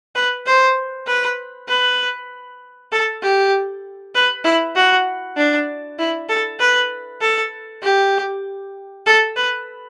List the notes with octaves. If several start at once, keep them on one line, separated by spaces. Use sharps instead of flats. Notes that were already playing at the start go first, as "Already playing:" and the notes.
B4
C5
B4
B4
A4
G4
B4
E4
F#4
D4
E4
A4
B4
A4
G4
A4
B4